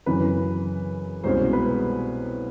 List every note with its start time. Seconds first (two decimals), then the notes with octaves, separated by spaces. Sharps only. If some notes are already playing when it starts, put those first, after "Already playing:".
0.06 F#2 C#3 E3 B4
1.24 C2 B2 G#3 C#4 C5
1.53 B4